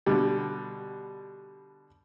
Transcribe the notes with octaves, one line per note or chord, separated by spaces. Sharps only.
B2 D3 G3